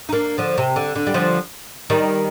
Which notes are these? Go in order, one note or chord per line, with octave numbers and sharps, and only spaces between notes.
D#4
A#3 D4
D3 F3
C3
D3
D3
G3
D3 F3
D#3 G3